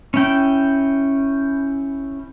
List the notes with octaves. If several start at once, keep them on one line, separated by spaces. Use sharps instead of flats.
C#4 E4 G5